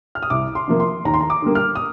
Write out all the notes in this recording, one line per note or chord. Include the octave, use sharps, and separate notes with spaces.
F6
D#6
C2 D6
C6
C3 F3 A#3
C6
D#2 A#5
C6
A#5
D6
D3 G3 A#3
F6
D#6